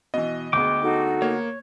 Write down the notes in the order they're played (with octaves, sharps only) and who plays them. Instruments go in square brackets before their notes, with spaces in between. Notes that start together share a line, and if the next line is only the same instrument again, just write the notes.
[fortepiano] B2 E3 [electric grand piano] D#5
[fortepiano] D2 G#3 B3 [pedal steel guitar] G5 D6
[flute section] D#4 F#4 A4
[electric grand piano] A#3 [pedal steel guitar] C#5